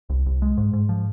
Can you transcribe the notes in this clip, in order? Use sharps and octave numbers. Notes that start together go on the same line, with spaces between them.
C2
C2
G#3
G#2
G#2
F3